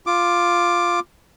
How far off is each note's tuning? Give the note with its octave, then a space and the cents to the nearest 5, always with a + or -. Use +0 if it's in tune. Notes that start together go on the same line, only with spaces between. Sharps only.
F4 +0 D6 +10